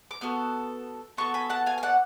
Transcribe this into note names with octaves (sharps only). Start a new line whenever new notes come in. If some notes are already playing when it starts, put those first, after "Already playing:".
D6
B3 F#4 A4 F6
B3 F#4 A4 A5 C#6
G#5 B5
F#5 A5
F5 G#5
G#5
D5 F#5